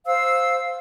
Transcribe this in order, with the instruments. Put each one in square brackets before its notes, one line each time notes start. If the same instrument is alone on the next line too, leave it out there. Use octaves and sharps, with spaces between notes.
[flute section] C5 F5 E6